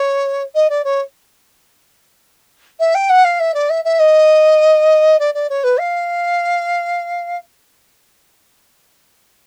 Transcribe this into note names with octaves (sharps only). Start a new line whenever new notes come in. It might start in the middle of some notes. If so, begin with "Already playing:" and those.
Already playing: C#5
D#5
D5
C#5
E5
G5
F#5
F5
E5
D5
E5
E5
D#5
D5
D5
C#5
B4
F5